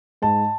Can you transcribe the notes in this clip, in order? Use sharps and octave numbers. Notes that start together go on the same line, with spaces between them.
G#2 A5